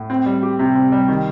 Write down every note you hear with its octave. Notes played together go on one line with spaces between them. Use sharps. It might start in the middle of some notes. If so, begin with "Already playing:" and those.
Already playing: A2
C4
G3
G4
C3
C4
G3
D#3